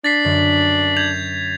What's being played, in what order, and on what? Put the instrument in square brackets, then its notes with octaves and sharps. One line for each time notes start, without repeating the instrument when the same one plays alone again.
[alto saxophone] D4 [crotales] A6 B6 C7
[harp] F#2 D3
[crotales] G6 G#6 F7